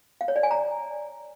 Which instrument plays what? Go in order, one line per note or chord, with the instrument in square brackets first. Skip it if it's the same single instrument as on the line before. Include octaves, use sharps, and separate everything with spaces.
[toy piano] F5
C#5
D5
G#5
A#5